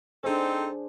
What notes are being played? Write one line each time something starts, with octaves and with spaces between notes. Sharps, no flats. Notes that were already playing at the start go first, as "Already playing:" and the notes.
C4 D4 D#4 G#4 A4 C5